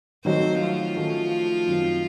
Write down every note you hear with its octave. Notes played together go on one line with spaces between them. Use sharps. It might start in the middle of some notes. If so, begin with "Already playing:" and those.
D#3 F#3 A3 C4 D#4 F#4 C5
F3 F4
D#3 A3 C#4 F#4
F#2 D#3 F#3 C4